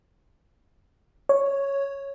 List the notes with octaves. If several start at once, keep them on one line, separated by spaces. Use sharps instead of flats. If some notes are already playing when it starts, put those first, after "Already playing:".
C#5